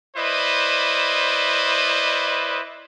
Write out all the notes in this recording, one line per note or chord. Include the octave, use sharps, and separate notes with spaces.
E4 B4 C5 D5 D#5